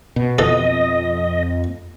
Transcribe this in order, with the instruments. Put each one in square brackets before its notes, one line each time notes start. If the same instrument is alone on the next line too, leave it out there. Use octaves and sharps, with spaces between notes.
[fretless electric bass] B2
[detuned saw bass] F2 [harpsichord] E3 A4 [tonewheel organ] D#5